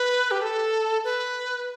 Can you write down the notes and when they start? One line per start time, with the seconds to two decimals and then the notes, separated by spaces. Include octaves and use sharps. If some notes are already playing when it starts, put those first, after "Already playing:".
Already playing: B4
0.31 G4
0.42 A4
1.04 B4